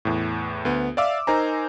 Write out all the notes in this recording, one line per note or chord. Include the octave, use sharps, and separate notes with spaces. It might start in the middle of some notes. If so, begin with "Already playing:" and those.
E2 A2
D2 B3
D5 E5 F5 D6 E6
D#4 A#4 C5 G#5 A#5